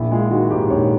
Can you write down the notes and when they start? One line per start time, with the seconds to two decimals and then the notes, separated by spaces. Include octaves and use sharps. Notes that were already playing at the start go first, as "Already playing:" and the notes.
Already playing: A#1 E4
0.11 G#3 F4
0.30 D#3 F#4
0.50 G#2 G4
0.70 A#1 C#5